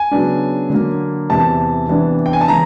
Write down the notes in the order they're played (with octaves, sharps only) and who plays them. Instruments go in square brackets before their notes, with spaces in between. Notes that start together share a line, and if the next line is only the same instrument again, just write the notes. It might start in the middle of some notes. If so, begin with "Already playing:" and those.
Already playing: [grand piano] G#5
C#3 F#3 B3 D4
D3 F#3 A#3
E2 C3 E3 A5
C3 E3 G3 B3 D4
G5
G#5
A5
C#3 E3 A#5